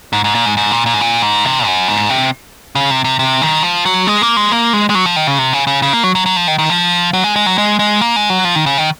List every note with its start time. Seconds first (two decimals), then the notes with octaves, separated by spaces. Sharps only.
0.13 G#2
0.24 G#2
0.35 A#2
0.46 G#2
0.57 G#2
0.71 A#2
0.86 A#2
0.94 G#2
1.00 A#2
1.22 G#2
1.45 C3
1.66 F#2
1.88 G#2
2.10 C3
2.75 C#3
2.90 C3
3.04 C3
3.19 C3
3.42 D#3
3.63 F3
3.85 F#3
4.07 G#3
4.22 A#3
4.37 G#3
4.51 A#3
4.73 G#3
4.90 G#3
4.95 F#3
5.06 F3
5.16 D#3
5.27 C#3
5.39 C3
5.53 C#3
5.67 C#3
5.82 C#3
5.93 A#3
6.03 F#3
6.15 F#3
6.26 F#3
6.36 F3
6.48 D#3
6.59 D#3
6.70 F3
7.13 F#3
7.24 G#3
7.36 G#3
7.46 F#3
7.58 G#3
7.79 G#3
8.01 A#3
8.16 G#3
8.30 F#3
8.45 F3
8.56 D#3
8.66 C#3
8.78 D#3